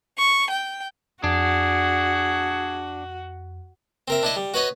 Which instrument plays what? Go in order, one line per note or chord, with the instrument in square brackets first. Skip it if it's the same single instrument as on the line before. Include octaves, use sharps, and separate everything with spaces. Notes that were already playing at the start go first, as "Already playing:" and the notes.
[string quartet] C#6
G5
[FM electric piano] F2 [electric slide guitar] D4 [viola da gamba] F#4 [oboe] G#4
[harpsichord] C4 A#4 E5
D4 E4 D#5
G3
F#4 B4 C#5 D#5